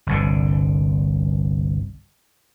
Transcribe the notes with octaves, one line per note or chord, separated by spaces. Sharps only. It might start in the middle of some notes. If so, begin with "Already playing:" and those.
G1 C2 D3